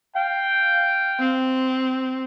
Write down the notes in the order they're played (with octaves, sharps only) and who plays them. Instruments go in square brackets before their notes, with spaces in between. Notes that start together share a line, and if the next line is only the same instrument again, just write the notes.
[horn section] F5 G5
[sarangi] C4